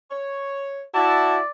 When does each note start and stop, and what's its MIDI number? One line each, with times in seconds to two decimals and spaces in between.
0.10 0.83 73
0.95 1.40 64
0.95 1.39 66
0.95 1.51 74
0.95 1.38 81